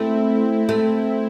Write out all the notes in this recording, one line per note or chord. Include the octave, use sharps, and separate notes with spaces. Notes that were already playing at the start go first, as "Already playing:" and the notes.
Already playing: A3 C4 E4
A3